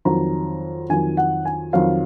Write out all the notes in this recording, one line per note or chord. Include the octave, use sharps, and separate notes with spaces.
F2 D#3 F#3 A#5
F2 D#3 F#3 G#5
F#5
G#5
F2 D#3 F#3 F5